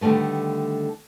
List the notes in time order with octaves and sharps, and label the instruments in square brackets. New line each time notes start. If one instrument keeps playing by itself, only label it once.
[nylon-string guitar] D3 D#3 G3 A3 B3